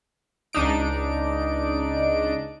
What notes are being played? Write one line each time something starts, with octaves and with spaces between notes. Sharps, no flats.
C#2 D4 D#4 D7